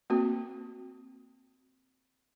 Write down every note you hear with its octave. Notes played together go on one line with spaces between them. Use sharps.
A#3 C4 F#4